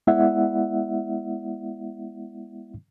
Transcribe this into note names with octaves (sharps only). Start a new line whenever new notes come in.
G#3 B3 E4 D5 E5 F#5